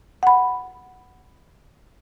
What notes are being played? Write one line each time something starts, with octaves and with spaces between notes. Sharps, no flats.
F#5 B5